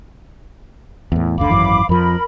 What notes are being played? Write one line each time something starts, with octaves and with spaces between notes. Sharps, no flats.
E2 A2
F#1 D2 D3 F5 B5 D6
G#1 F#2 E3
F2 F3 A#4 B5